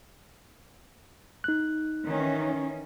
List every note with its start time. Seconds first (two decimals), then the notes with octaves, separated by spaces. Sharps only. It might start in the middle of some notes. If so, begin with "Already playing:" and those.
1.44 D#4 F#6
2.06 D#3 E3 C#4